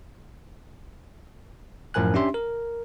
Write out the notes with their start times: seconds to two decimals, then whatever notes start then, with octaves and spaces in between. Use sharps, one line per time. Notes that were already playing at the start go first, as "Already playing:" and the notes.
1.94 F#2 A2 F3 A#4 G#5 F#6
2.14 C#4 D4 G4 E5 C6
2.34 A#4